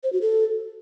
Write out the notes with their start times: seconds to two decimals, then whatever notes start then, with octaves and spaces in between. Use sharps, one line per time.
0.04 C5
0.13 F#4
0.22 A4